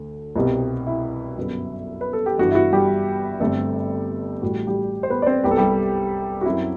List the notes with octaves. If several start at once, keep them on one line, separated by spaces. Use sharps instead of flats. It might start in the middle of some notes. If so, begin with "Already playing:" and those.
Already playing: D2 D3 A3
C2 B2 G3 C4
E4
G1 F#2 F#3 B3
B4
A4
G4
G1 G2 E3 F#4
E4
F#4
G3 G4
G1 G2 D3 G3 A3 C4 A4
A1 A2 G3 F#4
G3 G4
C5
B3 B4
D5
C4 C5
C2 C3 G3 B3 G4
A4
G3 G4
F#4
F#2 F#3 C4 E4